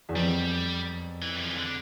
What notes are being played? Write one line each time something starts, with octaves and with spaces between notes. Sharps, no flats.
E2
F2 G3
E3
G3
F3
E3
D3